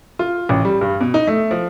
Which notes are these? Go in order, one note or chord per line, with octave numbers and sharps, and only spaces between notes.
F4
A1
G3
G2
B2
D#4
A3
F3